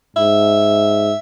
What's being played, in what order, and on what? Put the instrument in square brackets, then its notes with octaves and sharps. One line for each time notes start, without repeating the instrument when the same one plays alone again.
[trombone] G#2 [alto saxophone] E5